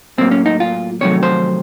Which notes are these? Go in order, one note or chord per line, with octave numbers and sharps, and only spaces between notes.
A2 F#3 A#3 C4
C#4
D#4
F4
F2 C3 D#3 F#3 A3 C#5
C5